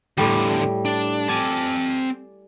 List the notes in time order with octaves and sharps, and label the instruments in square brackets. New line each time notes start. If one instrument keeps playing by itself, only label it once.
[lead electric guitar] E2 D3 [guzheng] A2 G3
[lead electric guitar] D4
[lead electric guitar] C4 A5 [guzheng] D5 G#5